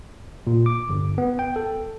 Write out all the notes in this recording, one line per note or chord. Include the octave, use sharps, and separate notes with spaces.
A#2
D6
G1
B3
G5
A4